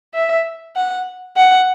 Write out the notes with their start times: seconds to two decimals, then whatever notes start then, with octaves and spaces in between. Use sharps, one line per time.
0.14 E5
0.75 F#5
1.37 F#5